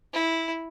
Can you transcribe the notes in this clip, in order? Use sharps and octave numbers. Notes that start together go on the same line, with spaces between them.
E4